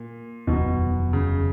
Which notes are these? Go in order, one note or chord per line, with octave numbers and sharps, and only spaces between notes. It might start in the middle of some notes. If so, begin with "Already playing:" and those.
Already playing: A#2
F1 D#2 B2 D#3 F#3
C#3